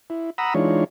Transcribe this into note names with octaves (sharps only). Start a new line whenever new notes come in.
E4
F#5 A#5 B5 D#6 E6
E3 G#3 D4 D#4 F4 C#5